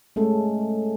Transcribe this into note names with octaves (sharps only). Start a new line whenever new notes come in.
G#3 A3 C#4 A4